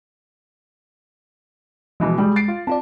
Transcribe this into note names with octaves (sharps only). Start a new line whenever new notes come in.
B2 E3 F3 G#3
G3 G#3 G#4
A6 C7 D7
F4
C4 F4 D5 A5